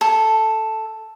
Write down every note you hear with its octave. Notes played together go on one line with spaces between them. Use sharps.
A4